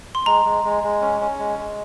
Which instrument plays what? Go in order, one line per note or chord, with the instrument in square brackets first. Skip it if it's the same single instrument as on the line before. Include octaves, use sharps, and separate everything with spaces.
[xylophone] C6
[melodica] G#3 [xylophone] A#5
[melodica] G#3
G#3
G#3
C#4
C#4
G#3
G#3